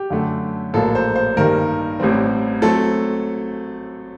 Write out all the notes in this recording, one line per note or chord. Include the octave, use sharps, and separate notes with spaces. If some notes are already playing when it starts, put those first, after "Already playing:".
Already playing: G4
F#2 D3 A3
A#1 A2 F#3 A#3 A4
C5
C5
G2 D#3 G3 A#3 A#4
A1 A2 G3 C4
F#3 A3 C4 A4